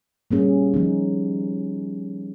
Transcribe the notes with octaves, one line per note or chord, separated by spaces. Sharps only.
G3 A#3 C#4 G#4
F3 A#3 D#4